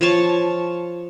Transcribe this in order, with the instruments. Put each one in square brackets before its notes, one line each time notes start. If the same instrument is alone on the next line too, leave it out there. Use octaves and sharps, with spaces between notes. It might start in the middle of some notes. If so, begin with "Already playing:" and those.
[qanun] F3 C#5 A5 C#6